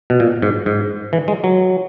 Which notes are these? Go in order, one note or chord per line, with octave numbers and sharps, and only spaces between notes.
B2
A#2
G#2
G#2
E3
G#3
F#3